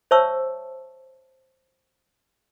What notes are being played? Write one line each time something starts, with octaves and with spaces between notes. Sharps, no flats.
C5 C#5 E5 A5 C#6 E6